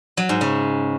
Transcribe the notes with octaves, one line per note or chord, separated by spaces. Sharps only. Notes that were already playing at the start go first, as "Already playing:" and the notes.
F#3
G#2
C#3